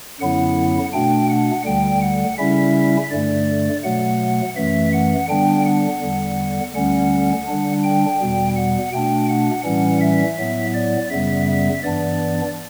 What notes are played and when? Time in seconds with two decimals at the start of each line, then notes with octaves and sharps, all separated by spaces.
0.20 F#2 D3 F#3 B3 E4 F#5
0.93 B2 A3 D4 G5
1.29 F#5
1.65 D2 D3 G3 G5
2.01 F#5
2.38 C#3 G3 C#4 E4 E5
3.11 G2 D3 A3 D5
3.84 B2 F#3 A3 F#5
4.56 F#2 E3 A3 E5
4.93 F#5
5.29 D3 G3 B3 D4 G5
5.65 F#5
6.02 E2 D3 G3
6.74 D2 D3 G3 C#4 F#5
7.47 D3 G3 D4
7.83 G5
8.20 E2 B2 G3
8.56 F#5
8.92 B2 A3 D4 G5
9.29 F#5
9.65 A2 E3 G3 C#4 F#5
10.01 E5
10.38 A2 F#3 B3
10.74 D5
11.10 F#2 C#3 G3 B3 E5
11.47 E5
11.83 G2 E3 B3 D4 D5